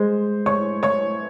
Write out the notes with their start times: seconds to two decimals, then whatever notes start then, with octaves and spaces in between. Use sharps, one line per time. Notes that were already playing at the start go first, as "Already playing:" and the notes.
Already playing: G#3 C5
0.46 C#5 C#6
0.83 C#5 C#6